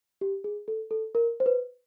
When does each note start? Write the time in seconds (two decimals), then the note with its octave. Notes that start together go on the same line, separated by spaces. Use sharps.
0.21 G4
0.44 G#4
0.68 A4
0.91 A4
1.15 A#4
1.40 C5
1.46 B4